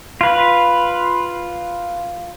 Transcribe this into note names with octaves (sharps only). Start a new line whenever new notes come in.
F4 B4